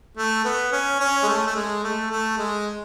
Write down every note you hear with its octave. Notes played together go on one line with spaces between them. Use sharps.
A3
B3
C#4
C#4
G#3
A3
A3
G#3
A3
A3
G#3